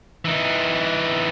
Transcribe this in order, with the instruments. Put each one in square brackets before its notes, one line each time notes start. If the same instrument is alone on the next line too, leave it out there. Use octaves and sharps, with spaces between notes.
[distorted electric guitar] E3 D#4